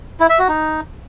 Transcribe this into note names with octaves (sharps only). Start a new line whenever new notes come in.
E4
E5
F#4
D#4